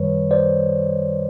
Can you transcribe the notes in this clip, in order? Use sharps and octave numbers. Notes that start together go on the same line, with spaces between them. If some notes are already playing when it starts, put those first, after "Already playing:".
Already playing: F#2 D#3 G3 B4 C#5
C5 D5